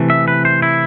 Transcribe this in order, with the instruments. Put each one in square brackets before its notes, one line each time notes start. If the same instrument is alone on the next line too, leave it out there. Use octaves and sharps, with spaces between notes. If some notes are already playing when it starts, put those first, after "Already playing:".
Already playing: [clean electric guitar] C3 E3 A3
E5
B4
C5
E4